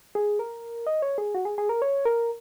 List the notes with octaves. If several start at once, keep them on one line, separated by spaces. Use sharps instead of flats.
G#4
A#4
D#5
C#5
G#4
F#4
G#4
G#4
A#4
C#5
A#4